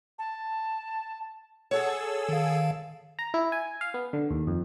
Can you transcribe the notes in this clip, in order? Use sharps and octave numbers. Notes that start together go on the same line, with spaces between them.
A5
G#4 A4 C#5 F#5 E6
D#3 F5
A#5
E4
G#5
F5
B3
D3
D#2
F2